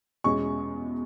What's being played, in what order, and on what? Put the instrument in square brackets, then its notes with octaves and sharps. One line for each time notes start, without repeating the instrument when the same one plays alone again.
[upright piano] E2 B2 G#3 C#4 C#6